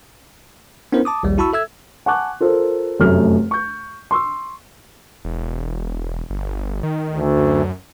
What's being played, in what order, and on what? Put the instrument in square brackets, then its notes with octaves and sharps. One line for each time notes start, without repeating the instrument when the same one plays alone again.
[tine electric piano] B3 C#4 D4 E4 A#4 C5
A5 D6 D#6
A#1 D#2 G3
E4 F#4 A5 B5 C#6 E6
A4 E5 E6 G#6
[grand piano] F#5 G#5 A5 C#6 D6 F#6
F4 A4 A#4 C5
F1 F#2 A3 F6
C#6 G6
C6 C#6 E6
[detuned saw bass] E1
G1
D#3
[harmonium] D2
[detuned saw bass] F#2